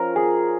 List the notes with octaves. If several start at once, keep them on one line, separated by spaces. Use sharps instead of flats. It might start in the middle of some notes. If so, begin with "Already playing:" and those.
Already playing: F3 C#4 F4 A#4
G#4